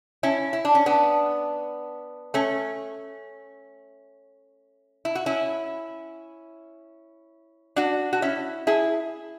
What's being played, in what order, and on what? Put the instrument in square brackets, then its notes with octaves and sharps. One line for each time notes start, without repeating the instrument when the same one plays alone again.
[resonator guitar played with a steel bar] C#4 E4
E4
D4
C#4
B3 D4
A3 C#4
E4
F#4
C#4 E4
D4 F#4
F#4
C#4 E4
E4 G#4